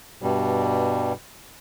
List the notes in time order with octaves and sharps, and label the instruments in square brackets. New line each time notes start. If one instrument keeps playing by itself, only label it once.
[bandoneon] G2 B2 G3